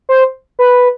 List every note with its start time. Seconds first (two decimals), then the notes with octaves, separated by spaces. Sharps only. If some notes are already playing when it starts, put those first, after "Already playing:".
0.09 C5
0.59 B4